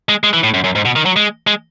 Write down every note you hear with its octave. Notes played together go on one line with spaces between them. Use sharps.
G#3
G#3
E3
A2
F#2
F#2
G#2
B2
D#3
F#3
G#3
G#3